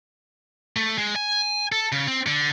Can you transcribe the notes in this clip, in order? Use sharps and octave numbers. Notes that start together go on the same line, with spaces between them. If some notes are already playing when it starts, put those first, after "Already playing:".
A3
G#3
G#5
A4
C#3
C4
D3